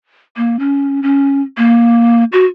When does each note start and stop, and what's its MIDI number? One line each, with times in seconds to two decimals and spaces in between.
0.37 0.59 58
0.59 1.03 61
1.03 1.42 61
1.57 2.24 58
2.32 2.45 66